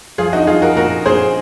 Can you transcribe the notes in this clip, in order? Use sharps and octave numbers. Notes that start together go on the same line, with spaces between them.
F3 F4 G#4
D#4 F#4
F3 F4 G#4
F#4 A#4
A#2 F#4 A#4
A#2 G#4 C5